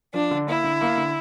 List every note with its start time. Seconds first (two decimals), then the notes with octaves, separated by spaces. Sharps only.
0.14 F3 D4
0.31 D3
0.47 A#3 E4
0.64 D3
0.81 A#3
0.97 D3